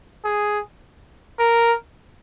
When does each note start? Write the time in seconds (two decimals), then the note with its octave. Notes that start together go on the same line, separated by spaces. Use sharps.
0.25 G#4
1.39 A#4